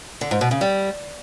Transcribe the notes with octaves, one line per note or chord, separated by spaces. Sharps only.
D3
G#2
B2
C#3
G3